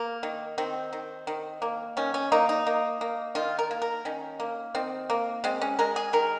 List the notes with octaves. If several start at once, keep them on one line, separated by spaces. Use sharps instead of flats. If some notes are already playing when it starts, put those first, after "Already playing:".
Already playing: A#3
D#3
D#3 C4
D#3
D#3
A#3
D#3 C#4
C#4
A#3 D#4
D#4
A#3
A#3
D#3 F4
A#4
A#3
A#4
D#3 C#4
A#3
D#3 C4
A#3
G#3 C4
C#4
G#3 A#4
G#4
D#3 A#4